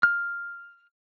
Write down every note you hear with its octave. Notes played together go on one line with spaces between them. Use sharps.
F6